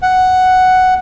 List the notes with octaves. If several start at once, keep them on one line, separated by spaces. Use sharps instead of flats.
F#5